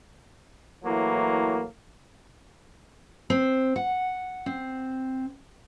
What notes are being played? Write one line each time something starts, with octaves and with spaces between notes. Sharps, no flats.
A2 E3 F#3 A#3
C4
F#5
C4